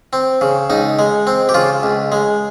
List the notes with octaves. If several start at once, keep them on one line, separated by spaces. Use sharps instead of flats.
C4
C#3
C#2 D#4
G#3
C4
G4
C#3 F4
C#2
G#3